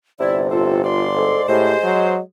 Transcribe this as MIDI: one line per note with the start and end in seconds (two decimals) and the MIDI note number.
0.20 1.33 31
0.20 0.90 48
0.20 0.40 64
0.20 0.50 74
0.51 0.84 45
0.51 0.84 60
0.51 0.82 65
0.51 0.84 69
0.85 1.08 65
0.85 1.44 74
0.85 1.44 84
1.15 1.46 44
1.15 1.42 69
1.48 1.74 45
1.48 2.20 56
1.48 1.78 67
1.48 2.15 72
1.83 2.19 54
1.83 2.20 75